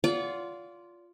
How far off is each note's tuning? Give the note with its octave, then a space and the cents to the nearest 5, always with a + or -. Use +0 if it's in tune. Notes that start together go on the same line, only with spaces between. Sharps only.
F4 +0 D5 -35 F#5 +0